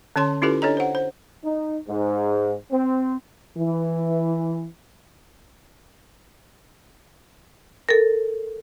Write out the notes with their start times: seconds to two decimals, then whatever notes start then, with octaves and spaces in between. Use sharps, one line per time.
0.16 D3 C#4 C#5 A5 C6
0.42 C#4 E4 F4 G4 A4 B4
0.62 D4 A4 C#5 D#5 A#5
0.77 C5 F#5
0.95 C5
1.43 D#4
1.88 G#2
2.71 C4
3.57 E3
7.89 A4 A#4